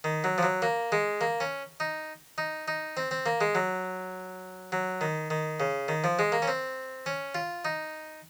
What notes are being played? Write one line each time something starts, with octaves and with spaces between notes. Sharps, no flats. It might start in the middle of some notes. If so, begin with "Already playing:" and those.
D#3
F#3
F3
F#3
A#3
G#3
A#3
C#4
D#4
D#4
D#4
C4
C4
A#3
G#3
F#3
F#3
D#3
D#3
C#3
D#3
F3
G#3
A#3
C#4
C4
C#4
F4
D#4